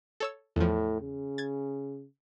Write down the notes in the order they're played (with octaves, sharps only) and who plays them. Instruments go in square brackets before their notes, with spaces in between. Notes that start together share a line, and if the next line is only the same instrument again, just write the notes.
[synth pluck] A4 C#5 E6
[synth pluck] E2 F3 [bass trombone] A2
[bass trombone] C#3
[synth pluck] G#6 A6